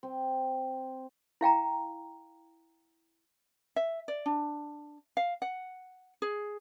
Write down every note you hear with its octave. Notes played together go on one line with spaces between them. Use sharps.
C4
E4 F5 G5 A#5
E5
D5
D4
F5
F#5
G#4